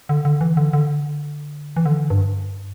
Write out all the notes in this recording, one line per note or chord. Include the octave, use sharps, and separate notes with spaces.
D3
D3
E3
D3
D3
E3
D3
G2